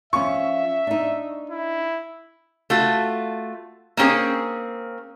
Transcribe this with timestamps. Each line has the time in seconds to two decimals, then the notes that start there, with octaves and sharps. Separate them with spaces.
0.13 F3 C#4 E5 C#6
0.87 D4 D#4
1.50 E4
2.70 A3 F4 F#4
3.97 A#3 C4 C#4 G#4